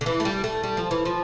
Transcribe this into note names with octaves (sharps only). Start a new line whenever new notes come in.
D3
E3
A3
G3
A3
G3
F3
E3
F3